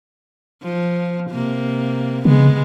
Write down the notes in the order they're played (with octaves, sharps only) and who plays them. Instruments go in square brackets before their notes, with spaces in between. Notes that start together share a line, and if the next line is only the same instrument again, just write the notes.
[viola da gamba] F3
C3 A#3
[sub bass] C#3 [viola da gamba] G#3 B3